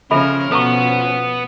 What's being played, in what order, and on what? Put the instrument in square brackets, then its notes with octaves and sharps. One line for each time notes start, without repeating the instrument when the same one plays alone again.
[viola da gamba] C#3 A#4 [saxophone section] F3 C#4 [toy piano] A4 E5 B5
[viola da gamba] B2 [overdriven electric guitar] B3 [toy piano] A4 A#5 C#6